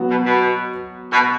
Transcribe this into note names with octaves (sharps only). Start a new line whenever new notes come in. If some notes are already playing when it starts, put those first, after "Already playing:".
Already playing: F#3 B3 F#4
B2
B2
B2